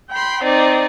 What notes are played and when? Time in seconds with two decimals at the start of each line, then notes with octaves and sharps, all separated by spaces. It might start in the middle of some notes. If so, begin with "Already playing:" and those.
0.11 G5 B5 C6
0.43 C4 D#4 D5